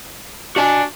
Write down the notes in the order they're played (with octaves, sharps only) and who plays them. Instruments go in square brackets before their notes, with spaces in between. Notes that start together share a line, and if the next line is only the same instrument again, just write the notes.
[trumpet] D4 [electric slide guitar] F#4 D5 G#5